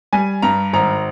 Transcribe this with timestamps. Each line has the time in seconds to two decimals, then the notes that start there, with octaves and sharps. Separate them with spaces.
0.13 G3 G#5
0.42 G2 A#5
0.73 G#1 A#5